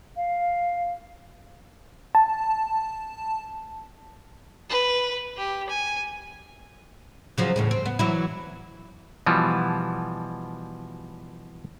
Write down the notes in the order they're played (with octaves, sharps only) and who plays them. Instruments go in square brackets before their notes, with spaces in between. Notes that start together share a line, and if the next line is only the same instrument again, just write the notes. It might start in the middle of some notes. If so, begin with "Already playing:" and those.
[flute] F5
[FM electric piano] A5
[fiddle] B4
G4
G#5
[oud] C#3 F3 F#3
E2 A2 C#3
C4
B3
E3 F#3 E4
[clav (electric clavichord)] B2 E3 F3 G3